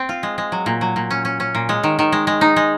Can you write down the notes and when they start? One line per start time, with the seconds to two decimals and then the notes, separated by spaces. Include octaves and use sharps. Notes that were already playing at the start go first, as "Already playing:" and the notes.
Already playing: C4
0.09 F4
0.23 G#3
0.38 G#3
0.52 F#3
0.66 A#2
0.81 F#3
0.96 A#2
1.11 C#4
1.25 C#4
1.40 C#4
1.55 A#2
1.69 G#3
1.83 D#3
1.99 D#3
2.12 G#3
2.27 G#3
2.41 D#4
2.56 G#3